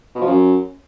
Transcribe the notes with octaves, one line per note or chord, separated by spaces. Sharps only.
B2
F3
F#2